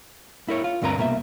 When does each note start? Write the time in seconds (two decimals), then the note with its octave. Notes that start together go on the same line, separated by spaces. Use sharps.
0.48 E4 A#4 C#5
0.64 F4
0.82 D2 G2 C4 A#4 B4 A#5
0.98 C2 B2 A#3 G#4 E5